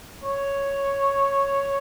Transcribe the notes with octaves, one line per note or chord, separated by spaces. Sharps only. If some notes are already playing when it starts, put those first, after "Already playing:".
C#5